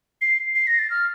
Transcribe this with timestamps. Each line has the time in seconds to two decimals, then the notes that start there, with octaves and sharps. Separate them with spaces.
0.21 C7
0.55 C7
0.67 A#6
0.79 A6
0.90 F6